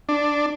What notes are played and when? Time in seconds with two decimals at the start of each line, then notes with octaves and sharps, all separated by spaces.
0.09 D4